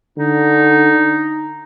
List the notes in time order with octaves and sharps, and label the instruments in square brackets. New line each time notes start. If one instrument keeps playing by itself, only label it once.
[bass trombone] D3 [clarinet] D#4